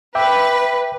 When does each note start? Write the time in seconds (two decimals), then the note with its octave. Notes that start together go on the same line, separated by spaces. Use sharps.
0.15 B4 E5 G5 D6